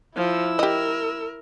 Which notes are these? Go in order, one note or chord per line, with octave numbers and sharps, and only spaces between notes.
F3 E4 E6
G4 A#4 D#5